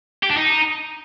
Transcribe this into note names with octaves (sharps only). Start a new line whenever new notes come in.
G4
D4
D#4